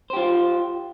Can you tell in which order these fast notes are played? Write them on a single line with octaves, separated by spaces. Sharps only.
C5 G4 F4